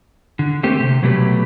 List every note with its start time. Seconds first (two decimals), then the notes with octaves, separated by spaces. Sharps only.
0.39 D3
0.63 A3 A#3 C4 G4
0.80 C3
1.03 B2 F#3 A3 G4 A#4 B4